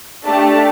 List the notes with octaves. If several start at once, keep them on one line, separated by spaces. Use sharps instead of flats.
A3 D4 G4 A5